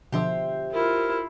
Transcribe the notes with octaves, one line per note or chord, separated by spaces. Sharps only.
B2 D3 F3 G4 C5 E5
E4 F4 A#4